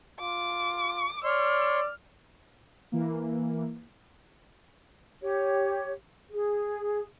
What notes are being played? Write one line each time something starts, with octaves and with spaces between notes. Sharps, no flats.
F4 D6
C#5 D5 C6 F6
E3 A#3
G4 C#5
G#4